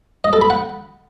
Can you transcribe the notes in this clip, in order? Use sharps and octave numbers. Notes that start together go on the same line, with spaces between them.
D#5
A4
B5
F#5